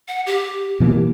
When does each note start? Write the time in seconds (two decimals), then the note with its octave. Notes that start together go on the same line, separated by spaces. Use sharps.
0.08 F#5
0.26 G4
0.80 B2 E3 A#3